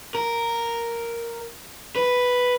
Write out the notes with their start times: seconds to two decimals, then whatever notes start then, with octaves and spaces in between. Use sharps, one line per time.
0.15 A#4
1.96 B4